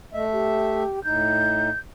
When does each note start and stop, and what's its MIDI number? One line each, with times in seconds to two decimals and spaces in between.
0.13 0.83 57
0.13 0.25 75
0.13 0.83 76
0.32 1.03 67
1.04 1.70 45
1.04 1.70 63
1.04 1.78 91